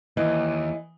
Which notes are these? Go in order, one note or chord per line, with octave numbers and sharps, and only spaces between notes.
D#2 E3 D#5